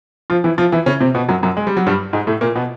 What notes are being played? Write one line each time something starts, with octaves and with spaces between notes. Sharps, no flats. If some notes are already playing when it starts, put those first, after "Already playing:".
F3 F4
E3 E4
F3 F4
E3 E4
C#3 C#4
C3 C4
B2 B3
F#2 F#3
F#2 F#3
G#3
G3
F#3
G2 G3
G#2 G#3
A2 A3
A#2 A#3
B2 B3